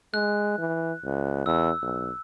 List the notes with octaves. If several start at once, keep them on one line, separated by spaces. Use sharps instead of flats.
G#3 F#6
E3
C#2
E2 E6
B1